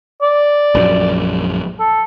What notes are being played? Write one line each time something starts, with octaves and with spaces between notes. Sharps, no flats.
D5
A#1 F#2
A4